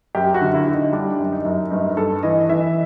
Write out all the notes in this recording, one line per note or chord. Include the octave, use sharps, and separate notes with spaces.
F#2 G4
F#4
D3
E4
D3
D#4
G3 D4
F#2
D#4
F#2
G2 D#4
G2 A4
E3 D#5
E3 E5